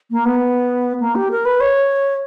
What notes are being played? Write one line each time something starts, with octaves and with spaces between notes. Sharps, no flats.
A#3
B3
A#3
G4
A#4
B4
C#5